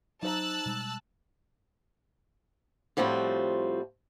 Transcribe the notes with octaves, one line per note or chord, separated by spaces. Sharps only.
F#3 D#4 C5 A5 A#5 E6 F#6
B2 G3 G#3
A2 F3 G3 C4 F#4